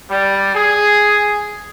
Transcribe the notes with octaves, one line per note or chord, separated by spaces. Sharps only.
G3
G#4